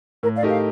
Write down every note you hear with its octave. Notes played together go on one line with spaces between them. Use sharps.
A2 A#4
D5 F5
A3 D#4 G4 A#4
F5